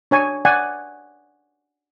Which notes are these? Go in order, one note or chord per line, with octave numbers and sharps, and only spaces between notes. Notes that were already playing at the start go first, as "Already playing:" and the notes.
D4 C#5 G#5
D5 F#5 G#5